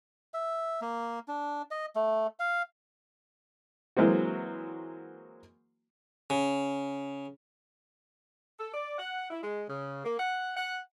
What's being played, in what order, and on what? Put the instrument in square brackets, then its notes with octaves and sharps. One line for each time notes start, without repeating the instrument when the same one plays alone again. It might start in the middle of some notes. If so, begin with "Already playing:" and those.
[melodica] E5
A#3
D4
D#5
A3
F5
[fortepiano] E3 F#3 G#3 A#3 C4 F#4
[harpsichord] C#3
[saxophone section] A4
D5
F#5
E4
G#3
C#3
A#3
F#5
F#5